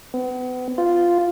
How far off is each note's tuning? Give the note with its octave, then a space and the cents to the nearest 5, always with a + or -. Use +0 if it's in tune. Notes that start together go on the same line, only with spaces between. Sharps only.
B3 +35
F4 -5